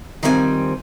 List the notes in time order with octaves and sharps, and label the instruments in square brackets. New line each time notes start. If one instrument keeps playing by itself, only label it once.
[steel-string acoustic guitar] D#3 F3 G3 C4 C#5 G#5